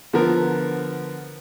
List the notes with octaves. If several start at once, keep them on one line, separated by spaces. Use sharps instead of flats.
D3 F3 B3 A#4